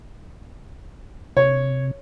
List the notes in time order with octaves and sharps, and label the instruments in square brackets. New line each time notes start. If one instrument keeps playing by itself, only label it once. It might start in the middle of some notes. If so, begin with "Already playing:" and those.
[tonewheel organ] C3 [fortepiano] C#5